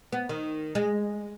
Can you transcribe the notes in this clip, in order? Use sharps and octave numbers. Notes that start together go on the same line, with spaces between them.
B3
D#3
G#3